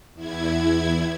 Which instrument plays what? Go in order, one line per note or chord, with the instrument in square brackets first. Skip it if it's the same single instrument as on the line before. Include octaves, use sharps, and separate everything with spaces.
[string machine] E2 E4 G#6